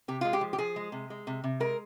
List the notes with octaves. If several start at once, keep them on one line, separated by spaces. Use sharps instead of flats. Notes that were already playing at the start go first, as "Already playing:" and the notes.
C3 G4
G#3 F4
G4
F3
G4
F3 G#4
G#3
C3
G#3
C3
C3
G#3 A#4